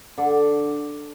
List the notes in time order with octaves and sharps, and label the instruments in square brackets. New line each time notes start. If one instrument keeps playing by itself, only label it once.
[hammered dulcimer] D3 D5